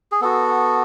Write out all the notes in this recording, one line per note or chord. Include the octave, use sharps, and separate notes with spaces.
G#4
B3 F#4 A4